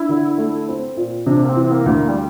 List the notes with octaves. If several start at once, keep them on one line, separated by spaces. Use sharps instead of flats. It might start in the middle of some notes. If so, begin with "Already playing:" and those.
Already playing: D4 E4
D3
A3
C4
A#2
C3 D4
A#3
C4
E3
C4
A#3
D2
A#3
G3